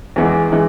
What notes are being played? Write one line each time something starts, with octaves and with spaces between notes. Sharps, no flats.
E2 E3 G#3
E3 G#3